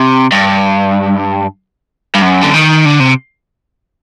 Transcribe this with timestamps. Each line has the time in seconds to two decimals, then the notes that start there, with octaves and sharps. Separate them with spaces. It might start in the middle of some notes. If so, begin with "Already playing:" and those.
Already playing: C3
0.32 G2
2.15 G2
2.22 F#2
2.42 D3
2.54 D#3
2.85 D3
3.00 C3